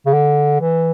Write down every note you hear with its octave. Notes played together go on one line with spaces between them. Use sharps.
C#3
D3
E3